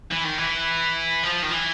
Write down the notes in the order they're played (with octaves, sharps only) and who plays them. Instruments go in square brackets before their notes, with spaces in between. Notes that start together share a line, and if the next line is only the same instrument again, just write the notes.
[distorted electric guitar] E3
D#3
E3
F3
D#3
E3